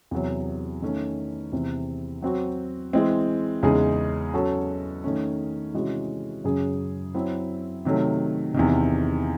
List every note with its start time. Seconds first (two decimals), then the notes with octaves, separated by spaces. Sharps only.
0.11 E2 C3 F#3
0.82 D#3 A3 C#4
1.52 E2 C3 E3 C4
2.22 F#3 C4 F#4
2.93 E3 G#3 C4
3.63 E2 C#3 G#3 D#4 G#4
4.34 F#3 C#4 F#4 A4
5.04 D#3 A3 C#4
5.74 C3 E3 G#3 C#4 F#4
6.44 F#2 C#3 F#3 C#4 G#4
7.14 F#3 C4 E4
7.85 C3 D#3 F#3 A3
8.54 E2 C3 D#3